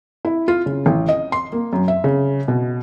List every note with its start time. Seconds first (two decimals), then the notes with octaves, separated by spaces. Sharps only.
0.25 E4
0.48 F4
0.66 C#3
0.86 A1
1.09 D#5
1.32 C6
1.52 A#3
1.73 F#2
1.88 E5
2.04 C#3
2.48 B2